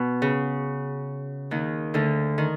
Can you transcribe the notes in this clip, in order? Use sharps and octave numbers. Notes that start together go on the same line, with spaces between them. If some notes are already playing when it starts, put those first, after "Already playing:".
Already playing: B2
C#3
D#2 D#3
D2 D3
D#3